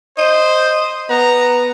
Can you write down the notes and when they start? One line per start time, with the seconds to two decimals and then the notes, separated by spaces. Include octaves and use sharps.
0.18 C5 D#5
1.10 B3 A#5